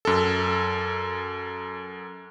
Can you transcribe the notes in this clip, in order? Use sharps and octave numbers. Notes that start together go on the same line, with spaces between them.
F#2 A4